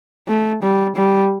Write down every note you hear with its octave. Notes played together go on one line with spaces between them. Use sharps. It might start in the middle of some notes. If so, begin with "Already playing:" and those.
A3
G3
G3